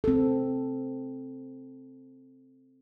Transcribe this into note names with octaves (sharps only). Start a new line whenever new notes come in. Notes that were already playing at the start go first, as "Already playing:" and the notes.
C4 A4